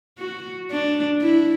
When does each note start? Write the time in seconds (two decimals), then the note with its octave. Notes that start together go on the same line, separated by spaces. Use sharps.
0.19 F#4
0.71 D4
1.22 E4